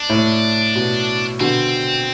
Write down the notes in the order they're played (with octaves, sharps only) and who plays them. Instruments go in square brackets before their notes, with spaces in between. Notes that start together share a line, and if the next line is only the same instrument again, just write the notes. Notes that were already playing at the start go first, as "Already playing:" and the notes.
Already playing: [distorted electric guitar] D4
[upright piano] A2
B2
[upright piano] B2 D3 [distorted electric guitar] C4